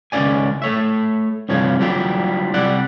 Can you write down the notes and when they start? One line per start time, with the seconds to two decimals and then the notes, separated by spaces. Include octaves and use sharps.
0.12 C#2 D#3 C#4 F4 D5 G#5
0.62 A3 C#5 E5
1.49 C2 G2 C3 F3 C#5
1.79 F#3 G3 D4 E4 F4 G4
2.54 C2 G3 D5 F#5